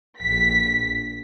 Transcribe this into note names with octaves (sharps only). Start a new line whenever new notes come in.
A#1 B6